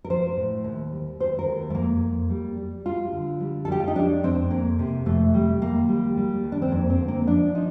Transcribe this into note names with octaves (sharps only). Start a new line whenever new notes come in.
A#4
F3 C5
A2
D#2
G3
D#2 C5
A#4
D#2
A3
F2 A#3
F2
G3
G3
G3 F4
D3
G3
A4
G3 G4
F4
D#4
F2 D4
F2 C4
F2 A#3
C3
F2 A3
G3
D#2 A#3
G3
G3
D#2
D4
C4
F2 A#3
C4
D3
A#3
F3 D4
F3 D#4